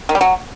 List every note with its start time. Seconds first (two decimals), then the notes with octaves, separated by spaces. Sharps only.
0.09 D#3
0.15 G3
0.21 F#3